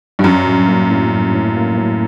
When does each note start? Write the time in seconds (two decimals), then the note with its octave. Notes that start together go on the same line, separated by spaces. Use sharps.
0.19 G2
0.24 F#2 F#3
0.46 A2
0.68 A#3
0.90 A2
1.12 F#3
1.34 A2
1.56 A#3
1.78 A2